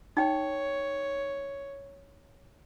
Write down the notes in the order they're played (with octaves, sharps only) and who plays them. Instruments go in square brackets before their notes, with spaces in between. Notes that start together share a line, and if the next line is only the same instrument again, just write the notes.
[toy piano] D#4 G5 [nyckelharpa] C#5